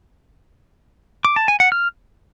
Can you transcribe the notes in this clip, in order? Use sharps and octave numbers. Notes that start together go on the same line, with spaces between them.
D6
A5
G#5
F#5
F6